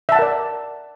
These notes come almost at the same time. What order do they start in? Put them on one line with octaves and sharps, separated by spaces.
E5 A5 F#5 A#4 D5